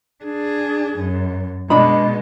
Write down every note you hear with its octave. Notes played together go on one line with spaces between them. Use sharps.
D4 G#4
F#2
B2 G#3 D4 D#5 B5